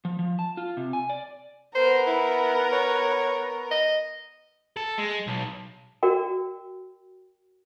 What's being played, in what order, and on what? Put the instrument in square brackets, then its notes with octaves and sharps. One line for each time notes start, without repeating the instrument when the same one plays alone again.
[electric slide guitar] F3
F3
A5
F4
C3
G#5
D5
[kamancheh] B3 A#4 [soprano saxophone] C5
[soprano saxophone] E4
C#5
D#5
[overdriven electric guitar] A4
G#3
B1
[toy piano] F#4 A#4 D5 G5